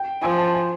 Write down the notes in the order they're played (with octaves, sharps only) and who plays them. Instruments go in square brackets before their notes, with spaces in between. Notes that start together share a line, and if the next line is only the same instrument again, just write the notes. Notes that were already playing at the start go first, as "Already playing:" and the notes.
Already playing: [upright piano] G5
[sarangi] F3 [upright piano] G#5
[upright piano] A5
G#5